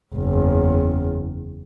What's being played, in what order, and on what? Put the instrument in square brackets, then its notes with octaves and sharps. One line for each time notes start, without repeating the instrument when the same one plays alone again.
[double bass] F#1 E2